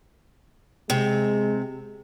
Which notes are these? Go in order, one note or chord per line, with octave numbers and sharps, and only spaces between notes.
C3 G#3